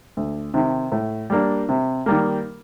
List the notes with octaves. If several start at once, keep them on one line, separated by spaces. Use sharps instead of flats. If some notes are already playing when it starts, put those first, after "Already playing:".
D2
C3 D#3
A2
G3 A#3 D4
C3
D#3 G3 A#3